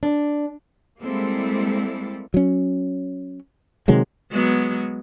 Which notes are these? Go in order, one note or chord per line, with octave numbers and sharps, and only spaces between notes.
D4
G3 G#3 A#3 C4 E4 A4
F#3 C#4
C3 D#3 F#3 G#3
F#3 G#3 B3